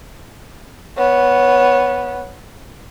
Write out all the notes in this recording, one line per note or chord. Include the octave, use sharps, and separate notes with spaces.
B3 C#5